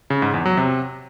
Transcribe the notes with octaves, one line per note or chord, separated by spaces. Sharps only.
C#3
G#2
E2
F#3
C3